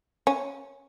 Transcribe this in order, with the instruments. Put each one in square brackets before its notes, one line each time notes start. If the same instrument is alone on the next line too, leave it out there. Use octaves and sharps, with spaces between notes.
[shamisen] C#4